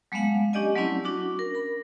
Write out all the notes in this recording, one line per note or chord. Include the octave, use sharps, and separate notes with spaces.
F#3 G#3 A3 B3 F5 F#5
C#4 D4 G4 D5 D#5 G#5
F#3 A3 C4 C#4 E4
C#4 D4 F#4 D6
A#4
A#4 B5